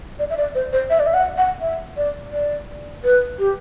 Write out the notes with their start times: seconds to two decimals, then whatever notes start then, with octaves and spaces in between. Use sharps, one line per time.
0.19 D5
0.30 E5
0.37 D5
0.55 C5
0.73 C5
0.90 E5
1.00 D5
1.06 E5
1.14 F#5
1.38 F#5
1.61 E5
1.97 D5
2.33 D5
3.04 B4
3.39 G4